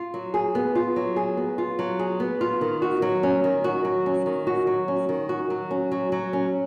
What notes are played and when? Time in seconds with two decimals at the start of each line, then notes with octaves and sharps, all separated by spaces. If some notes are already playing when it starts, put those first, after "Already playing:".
Already playing: F4
0.14 F#3
0.34 G#4
0.55 B3
0.75 F4
0.96 F#3
1.16 G#4
1.37 B3
1.58 F4
1.79 F#3
1.99 G#4
2.20 B3
2.41 F4
2.61 D#3
2.82 F#4
3.02 F#3
3.23 C#4
3.44 D#3
3.64 F#4
3.85 F#3
4.06 C#4
4.26 D#3
4.47 F#4
4.67 F#3
4.88 C#4
5.09 D#3
5.29 F#4
5.50 F#3
5.71 C#4
5.91 F#3
6.12 F#3
6.33 C#4